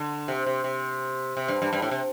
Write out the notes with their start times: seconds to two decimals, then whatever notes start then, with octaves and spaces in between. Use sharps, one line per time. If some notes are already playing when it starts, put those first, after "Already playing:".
Already playing: D3
0.28 C3
0.46 C3
0.64 C3
1.37 C3
1.48 G2
1.62 G2
1.73 G2
1.82 A2
1.91 C3